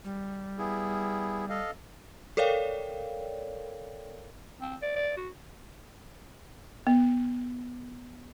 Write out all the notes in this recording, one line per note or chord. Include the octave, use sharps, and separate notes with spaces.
G3
B3 E4 G#4
A4 D#5 F5
A4 A#4 C#5 D5 F5 G5
C4
D5
D5
F#4
B3